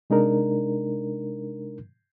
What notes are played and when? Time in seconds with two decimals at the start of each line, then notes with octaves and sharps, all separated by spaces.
0.10 C3 G#3 D4 D#4 A#4